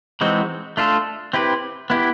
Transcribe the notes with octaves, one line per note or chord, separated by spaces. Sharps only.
E3 G#3 C4 D#4 F#4
A3 D4 F4 A4
C4 E4 G4 B4
B3 E4 G4